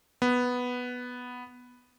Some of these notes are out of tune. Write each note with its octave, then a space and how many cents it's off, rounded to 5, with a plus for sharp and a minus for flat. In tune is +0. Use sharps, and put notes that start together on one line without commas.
B3 +0